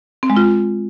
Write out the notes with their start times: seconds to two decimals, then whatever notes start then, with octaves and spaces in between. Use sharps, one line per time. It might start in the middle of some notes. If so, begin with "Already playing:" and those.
0.23 C4
0.30 G#3
0.37 F4